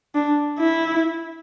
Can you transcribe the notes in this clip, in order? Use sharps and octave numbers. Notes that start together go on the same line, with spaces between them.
D4
E4